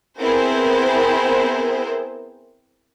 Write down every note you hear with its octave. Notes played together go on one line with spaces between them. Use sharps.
B3 C4 E4 G#4 A#4 C5